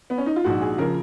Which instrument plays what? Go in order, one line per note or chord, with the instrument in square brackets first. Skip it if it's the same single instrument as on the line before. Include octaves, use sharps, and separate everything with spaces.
[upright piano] B3
C#4
D#4
F4
A#1 G#2 F3 F#4
G#4
C#3 F3 A#4